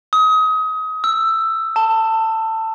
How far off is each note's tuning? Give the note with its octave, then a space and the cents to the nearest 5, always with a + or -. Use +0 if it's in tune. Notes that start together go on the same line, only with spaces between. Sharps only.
D#6 +25
E6 +10
A5 +20